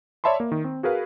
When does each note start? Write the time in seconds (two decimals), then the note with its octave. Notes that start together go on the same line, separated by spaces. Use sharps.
0.24 C#5 D5 E5 A5 B5 C6
0.40 A#3
0.52 D#3
0.64 C4
0.83 F#4 G#4 A#4 B4 F5